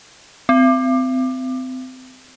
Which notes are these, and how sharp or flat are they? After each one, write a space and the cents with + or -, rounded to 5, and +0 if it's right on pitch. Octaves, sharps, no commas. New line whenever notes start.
C4 -30